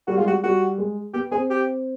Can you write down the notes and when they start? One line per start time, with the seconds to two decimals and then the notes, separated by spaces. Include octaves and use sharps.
0.07 G3 F#4
0.17 G#3 F4
0.26 G3 F#4
0.44 G3 F#4
0.78 G#3
1.13 B3 G4
1.31 C4 G#4
1.50 G4